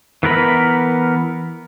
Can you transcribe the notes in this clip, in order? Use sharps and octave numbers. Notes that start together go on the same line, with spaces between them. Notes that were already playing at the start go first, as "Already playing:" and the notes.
E3 B3 A#4 B5